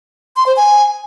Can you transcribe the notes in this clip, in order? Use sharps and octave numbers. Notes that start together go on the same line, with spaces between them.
C6
C5
G#5